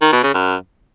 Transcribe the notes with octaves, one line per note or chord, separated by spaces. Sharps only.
D#3
B2
C#3
F#2